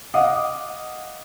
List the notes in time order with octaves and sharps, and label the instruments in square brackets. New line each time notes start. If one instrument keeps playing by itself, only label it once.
[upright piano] D#5 F5 F#5 D6 D#6